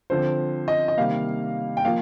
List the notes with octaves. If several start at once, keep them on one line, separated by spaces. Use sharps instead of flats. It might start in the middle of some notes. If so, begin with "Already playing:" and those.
D3 F3 C4 C5
D#5
D#5
C3 D#3 G3 A#3 F5
G5
F3 A#3 F5